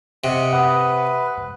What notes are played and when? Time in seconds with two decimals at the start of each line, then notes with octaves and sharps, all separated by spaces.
0.24 C3 D#5 F#5
0.53 B4 F#5 D#6